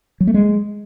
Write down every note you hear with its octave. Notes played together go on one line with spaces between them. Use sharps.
F#3
A3
G#3